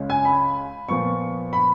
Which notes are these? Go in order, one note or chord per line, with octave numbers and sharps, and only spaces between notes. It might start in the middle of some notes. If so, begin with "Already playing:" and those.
Already playing: C#2 C#3 G#3 C#4
G#5
B5
A#2 F3 B3 C#6
B5